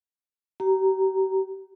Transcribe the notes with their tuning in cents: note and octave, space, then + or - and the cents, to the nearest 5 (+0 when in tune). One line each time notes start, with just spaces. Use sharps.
G4 -40 A#5 +0